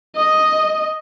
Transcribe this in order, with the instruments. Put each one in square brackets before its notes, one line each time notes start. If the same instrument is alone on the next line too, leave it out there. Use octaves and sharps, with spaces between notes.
[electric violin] D#5